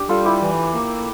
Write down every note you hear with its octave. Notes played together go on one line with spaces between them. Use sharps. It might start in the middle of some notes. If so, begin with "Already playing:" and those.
Already playing: D4 G4
G3 F4 A4
E4 G4
E3
A#3